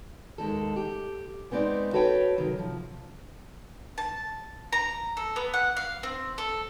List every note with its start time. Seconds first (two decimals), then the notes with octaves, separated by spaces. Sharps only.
0.38 D#2 G#3 D#4 A4
0.76 G4
1.51 G#3 B3 C4 D#4 D5
1.93 F#4 A4 B4 C#5 G5
2.38 C3 D#3 F#3
2.58 C3 F3
3.98 A5
4.73 A#5
5.17 A4
5.36 B3
5.54 F#5
5.77 F5
6.03 C4
6.38 A4